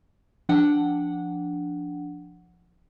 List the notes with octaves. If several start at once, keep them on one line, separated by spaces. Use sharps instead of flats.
F3 D4 F#5 G5